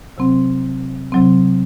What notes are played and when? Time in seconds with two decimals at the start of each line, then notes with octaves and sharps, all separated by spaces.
0.18 C3 F#3 C4
1.12 C3 F#3 C4